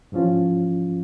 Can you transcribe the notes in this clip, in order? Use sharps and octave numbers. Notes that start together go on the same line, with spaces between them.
G#2 E3 F3 C#4 F4